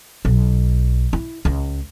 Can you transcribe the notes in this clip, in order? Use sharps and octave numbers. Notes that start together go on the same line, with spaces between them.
B1
E4
C#2